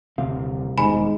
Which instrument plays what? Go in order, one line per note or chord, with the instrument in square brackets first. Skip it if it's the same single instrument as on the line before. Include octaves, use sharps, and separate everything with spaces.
[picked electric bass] D#1 D3 C4 [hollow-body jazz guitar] C2 F5
[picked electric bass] E1 B2 D#3 [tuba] G#2 [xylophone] G#5 B5